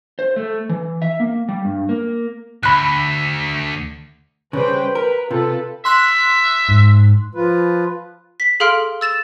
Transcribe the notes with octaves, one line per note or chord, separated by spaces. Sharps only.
C5
A3
E3
E5
A#3
G3
G2
A#3
D2 B5 F#6
C#3 G3 B4 C5 G5
A#4 B4
C3 F4 A4 B4
E5 C6 F#6
G#2
F3 F4 B4
B6
G#4 A4 F5 C6 F6 D7
E6 A6 E7